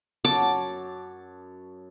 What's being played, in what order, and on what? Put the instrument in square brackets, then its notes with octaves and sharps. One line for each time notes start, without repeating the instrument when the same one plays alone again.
[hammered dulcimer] F#2 C#5 A5 [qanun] D6